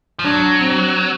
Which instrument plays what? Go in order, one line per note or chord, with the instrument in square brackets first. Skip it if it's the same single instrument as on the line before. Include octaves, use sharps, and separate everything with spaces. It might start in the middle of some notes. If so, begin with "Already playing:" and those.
[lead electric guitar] F3
[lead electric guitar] F#3 [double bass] D4
[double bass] C4